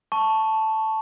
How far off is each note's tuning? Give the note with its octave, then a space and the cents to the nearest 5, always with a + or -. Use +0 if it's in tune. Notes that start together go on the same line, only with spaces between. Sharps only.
A5 +0 C#6 +0